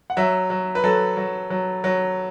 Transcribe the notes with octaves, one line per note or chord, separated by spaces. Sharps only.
F#5
F#3 E5
F#3
B4
F#3 A4
F#3
F#3
F#3